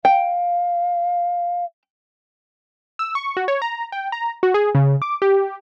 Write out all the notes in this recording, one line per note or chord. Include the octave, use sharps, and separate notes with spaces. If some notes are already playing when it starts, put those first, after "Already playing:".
F5 G5
E6
C#6
F#4
C#5
A#5
G5
A#5
F#4
G#4
C#3
D6
G4